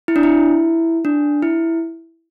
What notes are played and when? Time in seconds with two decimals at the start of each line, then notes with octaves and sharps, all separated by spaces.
0.08 E4
0.16 D4
0.23 E4
1.05 D4
1.42 E4